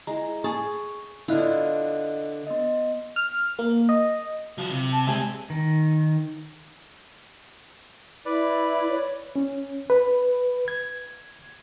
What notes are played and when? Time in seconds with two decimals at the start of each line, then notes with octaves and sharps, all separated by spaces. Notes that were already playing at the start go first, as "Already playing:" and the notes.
0.07 G#3 E4 A#5
0.44 G#4 A5 C#6
1.28 D3 B3 E4 F4 D#5 F#6
2.47 B3 D#5
3.16 F6
3.59 A#3
3.89 D#5
4.58 F#3 F4
4.71 C3
4.92 A5
5.07 C2 G#3 C4 G4 E5 G#5
5.50 D#3
8.26 E4 B4 D5
8.89 C#5
9.36 C#4
9.90 B4
10.68 G#6